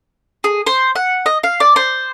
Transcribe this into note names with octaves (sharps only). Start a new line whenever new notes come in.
G#4
C5
F#5
D#5
F5
D5
C5